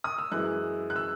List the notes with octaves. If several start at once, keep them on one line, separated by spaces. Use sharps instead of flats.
D#6
E6
F#2 E3 G#3 F#6
F#6
E6